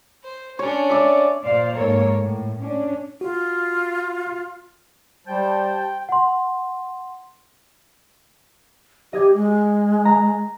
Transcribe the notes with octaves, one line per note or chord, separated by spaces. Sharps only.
C5
C#4 D4 C#5
C#5 D5 E5
A#2 C5 D5 F5
G#2 A#3 A4 A#4 C#5
A2
C#4 D4
F4 F#4
G3 G4 C5 G5 A5
F#5 C6
G4 D#5 G#6
G#3
A#5